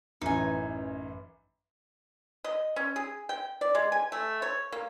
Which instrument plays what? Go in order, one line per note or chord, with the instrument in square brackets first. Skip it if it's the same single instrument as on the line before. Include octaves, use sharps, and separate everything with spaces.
[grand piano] A1 F#2 E3 [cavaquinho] D#4 G#5
[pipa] D#5
C#4
G#4
G5
D5
G#3
G#5
A3
C#5
A#3